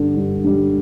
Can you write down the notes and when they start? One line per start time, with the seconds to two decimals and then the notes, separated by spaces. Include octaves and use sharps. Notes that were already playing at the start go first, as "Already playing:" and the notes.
Already playing: G2 D3 G3
0.17 G2
0.44 D3 G3